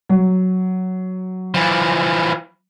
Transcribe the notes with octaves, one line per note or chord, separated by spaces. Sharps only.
F#3
E3 F3